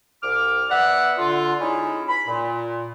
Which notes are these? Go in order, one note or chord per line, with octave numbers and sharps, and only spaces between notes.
C2 D6 F6
B3 D5 E5 F#5
D3 F4
G#3 C#4 D#4 E4
B5
A#2